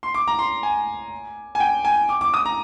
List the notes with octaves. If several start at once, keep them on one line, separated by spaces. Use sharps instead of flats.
C6
D6
A#5
C6
G#5
G#5
G5
G#5
D6
D6
D#6
A#5